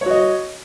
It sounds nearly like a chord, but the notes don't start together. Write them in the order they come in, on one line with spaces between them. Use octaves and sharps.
C#5 F#4 D#5